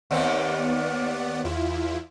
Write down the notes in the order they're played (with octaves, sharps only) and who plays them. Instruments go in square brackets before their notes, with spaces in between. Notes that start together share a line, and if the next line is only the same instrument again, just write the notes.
[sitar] D#2 D#3 C4 [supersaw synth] B3 D5 F#5
[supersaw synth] E2 E4 F4